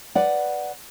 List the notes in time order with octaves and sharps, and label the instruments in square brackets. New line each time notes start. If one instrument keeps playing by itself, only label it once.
[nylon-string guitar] B4 D5 F#5